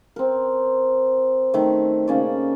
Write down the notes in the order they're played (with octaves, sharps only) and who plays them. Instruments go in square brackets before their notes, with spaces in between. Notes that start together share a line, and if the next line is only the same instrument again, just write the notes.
[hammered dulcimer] C4 A#4
D#3 A3
C#3 A#3 C#4 D5